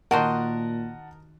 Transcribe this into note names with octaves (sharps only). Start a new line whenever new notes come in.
A#2 D#3 F#4 A#4 C5 D#5 F#5 A5